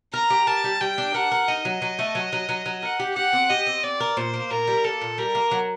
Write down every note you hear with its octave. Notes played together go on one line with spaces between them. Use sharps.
A#4 A#5
G4
A#4 A5
G3
G3 G5
D4
A#4 F#5
A#4
D#4 D#5
F#3
F#3
A3
F#3
F#3
F#3
F#3
A#4 F#5
G4
G4 F#5
C4
G4 D#5
C4
C4 D5
A#4
A#2 C5
A#3
A#2 A#4
G3
A#3 A4
A#2
G3 A#4
A#3
F#3